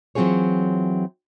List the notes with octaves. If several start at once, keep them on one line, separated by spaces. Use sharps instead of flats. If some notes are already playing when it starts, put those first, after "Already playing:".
E3 F#3 C4 F4 G#4 C#5